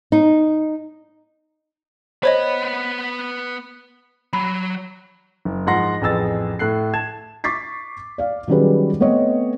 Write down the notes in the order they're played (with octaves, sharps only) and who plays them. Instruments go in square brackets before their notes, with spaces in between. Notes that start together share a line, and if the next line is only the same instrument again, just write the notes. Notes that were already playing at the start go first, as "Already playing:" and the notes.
[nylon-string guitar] D#4
[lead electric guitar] B3 B5 [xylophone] C5 C#5 D#5
[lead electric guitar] F#3 [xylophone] B5
[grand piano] F#1
G#2 F3 F#5 C6 A#6
A1 F2 G#4 E6 A6
A2 A4 F#6 C7
A5 G#6 E7
[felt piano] C#6 D6 A6 B6 C7
D5 F5
D#3 F#3 G3 C#4 G#4 B4
A3 B3 C4 C#5 D#5